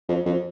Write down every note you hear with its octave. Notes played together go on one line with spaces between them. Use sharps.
F2
F2